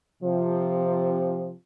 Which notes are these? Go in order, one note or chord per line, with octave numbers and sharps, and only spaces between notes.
C3 F3